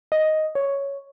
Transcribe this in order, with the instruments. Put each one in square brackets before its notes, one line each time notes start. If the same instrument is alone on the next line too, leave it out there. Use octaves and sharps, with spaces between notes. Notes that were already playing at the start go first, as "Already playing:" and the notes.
[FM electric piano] D#5
C#5